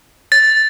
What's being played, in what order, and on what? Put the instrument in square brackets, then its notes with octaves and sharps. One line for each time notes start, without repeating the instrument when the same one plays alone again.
[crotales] A6